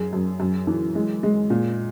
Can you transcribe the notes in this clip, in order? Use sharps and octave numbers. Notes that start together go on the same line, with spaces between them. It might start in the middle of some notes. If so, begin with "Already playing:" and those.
Already playing: F#2 G#4
F#2
F#2
E3
G#3
G#3
A#2